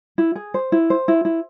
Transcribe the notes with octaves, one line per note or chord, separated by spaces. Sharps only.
E4
G#4
C5
E4
C5
E4
E4